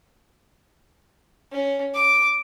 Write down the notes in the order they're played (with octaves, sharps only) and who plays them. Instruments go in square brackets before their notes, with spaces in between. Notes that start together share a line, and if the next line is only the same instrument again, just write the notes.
[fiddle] C#4
D6